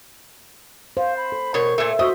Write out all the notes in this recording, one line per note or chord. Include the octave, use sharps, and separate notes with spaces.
C5 F5
B5
A4
B2 A#4 C#5
A#2 A3
F#4 C5 D#5 E5 C#6